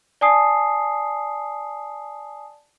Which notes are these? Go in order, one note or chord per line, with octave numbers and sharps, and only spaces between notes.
D5 G#5 A5 D#6 C7